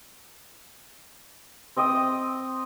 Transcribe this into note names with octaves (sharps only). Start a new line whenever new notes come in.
C4 D#5 G5 D#6